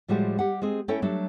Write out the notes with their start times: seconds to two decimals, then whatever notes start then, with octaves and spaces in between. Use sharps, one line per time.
0.08 A2 F3 G3 G#3 F#4 G4
0.39 G3 G4 F#5
0.62 G#3 C4 G#4
0.88 A3 C#4 E4 A4 C#5 G5
1.02 F#3 G3 A3 D4